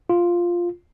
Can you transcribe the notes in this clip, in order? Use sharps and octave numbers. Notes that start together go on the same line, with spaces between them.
F4